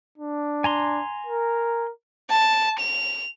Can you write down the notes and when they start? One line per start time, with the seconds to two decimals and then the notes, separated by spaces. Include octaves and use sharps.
0.18 D4
0.64 G#5 A#5 C6
1.26 A#4
2.30 A5
2.79 F7